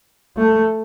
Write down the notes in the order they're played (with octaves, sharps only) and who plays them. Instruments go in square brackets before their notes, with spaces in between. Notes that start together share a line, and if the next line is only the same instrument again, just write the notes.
[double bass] A3